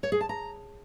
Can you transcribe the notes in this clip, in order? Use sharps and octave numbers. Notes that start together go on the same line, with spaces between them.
C#5
G#4
A5
A#5